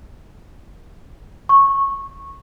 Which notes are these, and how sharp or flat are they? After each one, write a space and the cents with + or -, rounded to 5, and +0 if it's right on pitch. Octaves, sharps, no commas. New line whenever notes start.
C#6 -15